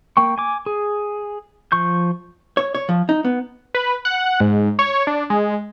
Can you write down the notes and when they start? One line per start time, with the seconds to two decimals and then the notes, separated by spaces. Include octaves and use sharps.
0.17 A#3 G5 C#6
0.38 G#5 D6
0.66 G#4
1.72 F3 C#6 G6
2.57 C#5
2.75 C#5
2.89 F3
3.09 D#4
3.24 B3
3.74 B4
4.05 F#5
4.40 G#2
4.79 C#5
5.07 D4
5.30 G#3